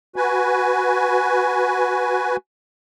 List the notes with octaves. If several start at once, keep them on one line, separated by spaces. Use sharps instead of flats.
F#4 B4 G#5